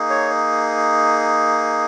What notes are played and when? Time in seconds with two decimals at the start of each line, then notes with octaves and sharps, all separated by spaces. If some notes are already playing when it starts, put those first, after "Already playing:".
Already playing: A#3 D#4 G#4
0.10 C#5